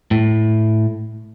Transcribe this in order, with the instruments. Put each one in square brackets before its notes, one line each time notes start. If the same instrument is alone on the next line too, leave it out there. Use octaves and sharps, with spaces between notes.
[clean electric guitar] A2